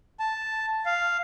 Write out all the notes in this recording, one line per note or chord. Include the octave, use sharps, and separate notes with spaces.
A5
F5